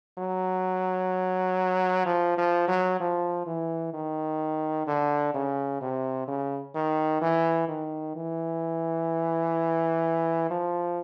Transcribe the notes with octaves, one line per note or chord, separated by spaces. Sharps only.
F#3
F3
F3
F#3
F3
E3
D#3
D3
C#3
C3
C#3
D#3
E3
D#3
E3
F3